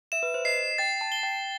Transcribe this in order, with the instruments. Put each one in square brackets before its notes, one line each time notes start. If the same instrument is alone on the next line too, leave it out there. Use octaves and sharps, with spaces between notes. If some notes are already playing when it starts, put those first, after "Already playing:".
[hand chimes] E5 [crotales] E7
[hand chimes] B4
C5
[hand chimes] D#5 [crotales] C7
[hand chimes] G5 [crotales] A6
[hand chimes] A5
[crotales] G7
[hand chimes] G5